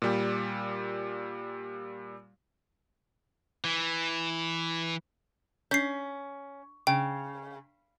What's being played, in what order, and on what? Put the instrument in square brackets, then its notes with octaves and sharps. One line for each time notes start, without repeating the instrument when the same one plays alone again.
[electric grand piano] A#2 G3 G4
[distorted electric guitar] E3
[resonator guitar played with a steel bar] C#4 [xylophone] G6 C7
[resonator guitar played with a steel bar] C#3 [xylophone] G5